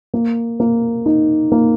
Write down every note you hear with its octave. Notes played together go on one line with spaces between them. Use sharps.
A#3
A#3
D#4
A#3